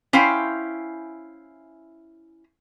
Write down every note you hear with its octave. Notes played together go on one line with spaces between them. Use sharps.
C#4 E4 C5 F5 G5